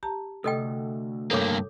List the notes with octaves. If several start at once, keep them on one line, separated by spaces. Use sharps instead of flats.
G4 A5 A#5
D2 C3 A4 D#5 G5
G2 A#3 A4 C#5 D6